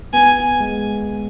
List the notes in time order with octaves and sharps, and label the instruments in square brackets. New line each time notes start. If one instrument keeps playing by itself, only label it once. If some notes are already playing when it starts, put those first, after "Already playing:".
[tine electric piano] B3 [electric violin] G#5
[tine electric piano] G#3